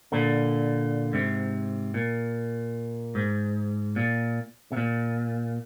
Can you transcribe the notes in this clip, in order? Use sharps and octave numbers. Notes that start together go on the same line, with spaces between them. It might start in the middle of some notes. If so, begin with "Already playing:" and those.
A#2 D3
G#2 C3
A#2
G#2
A#2
C3
A#2